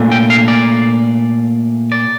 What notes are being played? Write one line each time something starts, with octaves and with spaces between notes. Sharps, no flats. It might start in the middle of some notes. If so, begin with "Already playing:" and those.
Already playing: A#2 A3 D4
G5
F5
D5
D5